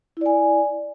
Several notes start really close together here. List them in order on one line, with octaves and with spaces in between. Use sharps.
E4 D5 G#5